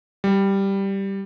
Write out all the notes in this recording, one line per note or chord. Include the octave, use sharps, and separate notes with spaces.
G3